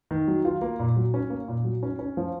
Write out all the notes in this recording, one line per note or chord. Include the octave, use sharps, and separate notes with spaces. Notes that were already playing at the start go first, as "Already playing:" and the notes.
D#3
F#3
F4
A#3
A#2
F#3
C#4
A#3
A#2
F#3
C#4
C#4
F3